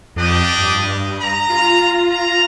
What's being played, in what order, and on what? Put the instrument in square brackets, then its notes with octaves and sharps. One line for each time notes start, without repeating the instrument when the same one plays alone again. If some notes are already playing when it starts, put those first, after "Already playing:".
[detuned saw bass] F2 [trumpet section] D4 G4 D#5
[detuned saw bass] G2
[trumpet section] A#5
[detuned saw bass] F4
[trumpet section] A#5